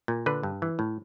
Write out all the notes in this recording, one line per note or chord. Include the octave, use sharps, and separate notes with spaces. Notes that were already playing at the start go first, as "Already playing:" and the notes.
A#2
D3 B4
G2
E3
A2